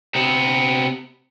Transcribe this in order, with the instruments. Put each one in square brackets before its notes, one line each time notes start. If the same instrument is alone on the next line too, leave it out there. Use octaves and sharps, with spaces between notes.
[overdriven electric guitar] C3 B3